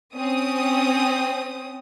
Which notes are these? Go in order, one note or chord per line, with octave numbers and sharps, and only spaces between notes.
C4 C#4 D#6